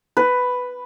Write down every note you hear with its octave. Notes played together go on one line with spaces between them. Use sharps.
B4